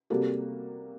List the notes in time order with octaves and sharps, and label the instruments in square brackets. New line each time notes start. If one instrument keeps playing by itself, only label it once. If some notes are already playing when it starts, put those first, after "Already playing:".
[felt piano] C3 G3 A#3 F#4 A4